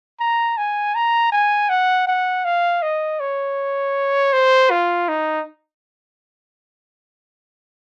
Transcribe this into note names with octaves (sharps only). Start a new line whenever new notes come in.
A#5
G#5
A#5
G#5
F#5
F#5
F5
D#5
C#5
C5
F4
D#4